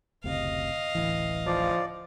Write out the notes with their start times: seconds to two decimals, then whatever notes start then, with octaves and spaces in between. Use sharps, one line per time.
0.24 F#1 D2 C3 D#5 F5
0.95 D1 A1 E3
1.46 F3 D5